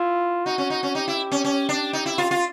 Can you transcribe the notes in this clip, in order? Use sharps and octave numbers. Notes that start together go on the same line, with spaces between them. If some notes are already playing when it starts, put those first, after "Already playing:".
Already playing: E4 F4
D#4 F#4
C#4
D#4
C#4
D#4 G4
E4
C#4
C#4
D4
D#4
E4
F4
F4